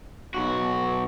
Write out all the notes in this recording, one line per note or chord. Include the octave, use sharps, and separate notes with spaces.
B1 F#4